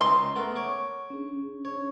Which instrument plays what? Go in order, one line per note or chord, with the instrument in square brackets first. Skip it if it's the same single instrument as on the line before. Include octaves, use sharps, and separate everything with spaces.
[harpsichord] C#2 D#4 D#5 [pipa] C6
[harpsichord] A3 B3 A#4
C#5 C#6 D6
[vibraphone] C#4 D4 G#4
[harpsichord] C#5